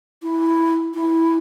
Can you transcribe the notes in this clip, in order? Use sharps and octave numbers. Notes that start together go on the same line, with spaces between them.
E4
E4